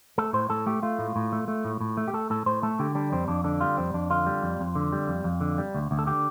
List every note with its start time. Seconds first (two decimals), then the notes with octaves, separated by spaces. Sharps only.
0.18 A3 A4
0.33 A2 C5
0.50 A2 A4
0.66 A3 G4
0.83 A3 F4
0.99 A2
1.16 A2
1.32 A3
1.48 A3
1.65 A2
1.81 A2
1.97 A3
2.08 G4
2.13 A3 A4
2.30 A2 A4
2.46 A2 C5
2.63 A3 A4
2.79 D3 G4
2.95 G3 D4
3.12 F2 C4
3.28 F2 D4
3.44 D3 D4
3.61 G3 F4
3.77 F2 C4
3.94 F2 D4
4.10 D3 F4
4.26 G3
4.43 F2
4.60 F2
4.75 D3
4.92 G3
5.08 F2
5.24 F2
5.41 D3
5.58 G3
5.75 D2
5.91 D2
5.99 A4
6.06 D3 G4